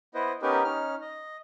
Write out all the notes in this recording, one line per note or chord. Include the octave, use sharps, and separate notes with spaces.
B3 E4 B4 C5 D#5
B3 C#4 D#4 G4 A#4 B4
C#4 D#4 F6
D#5